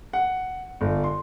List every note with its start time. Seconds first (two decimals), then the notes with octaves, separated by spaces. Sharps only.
0.13 F#5
0.81 G1
1.04 C6